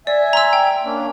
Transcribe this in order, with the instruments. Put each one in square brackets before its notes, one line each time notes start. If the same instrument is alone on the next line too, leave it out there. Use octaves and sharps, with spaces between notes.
[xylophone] D5 [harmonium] E5 G#5
[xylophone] A#5 C6 E6
G5
[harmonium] A#3 C#4 D4